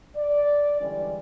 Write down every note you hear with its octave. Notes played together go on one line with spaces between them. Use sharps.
D5
D3 E3 G3 G#3 C#4